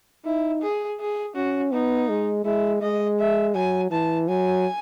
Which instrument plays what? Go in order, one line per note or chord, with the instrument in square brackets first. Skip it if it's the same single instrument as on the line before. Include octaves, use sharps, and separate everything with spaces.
[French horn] D#4 [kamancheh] E4
[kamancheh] G#4
G#4
[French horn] C#4 [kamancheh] F#4
[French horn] B3 [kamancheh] D#4
[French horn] G#3
[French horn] G#3 [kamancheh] E4
[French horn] G#3 [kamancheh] D#5
[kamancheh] E5
[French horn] F#3 [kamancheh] G#5
[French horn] E3 [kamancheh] A5
[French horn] F#3 [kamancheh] G#5